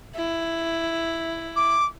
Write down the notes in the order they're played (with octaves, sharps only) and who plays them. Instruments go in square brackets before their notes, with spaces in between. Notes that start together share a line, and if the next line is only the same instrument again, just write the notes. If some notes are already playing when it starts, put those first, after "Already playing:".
[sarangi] E4
[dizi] D6